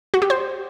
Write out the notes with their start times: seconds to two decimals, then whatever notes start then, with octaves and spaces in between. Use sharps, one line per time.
0.14 F#4
0.22 G4
0.30 C5